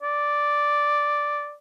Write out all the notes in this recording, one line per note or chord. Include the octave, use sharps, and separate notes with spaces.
D5